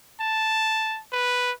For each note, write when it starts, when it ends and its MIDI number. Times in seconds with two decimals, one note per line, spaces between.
0.20 1.00 81
1.12 1.52 71